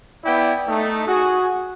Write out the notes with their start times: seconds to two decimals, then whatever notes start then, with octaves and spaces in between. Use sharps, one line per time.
0.25 B3 E4 D5 G5
0.68 A3 D#4
1.06 F#4 G#4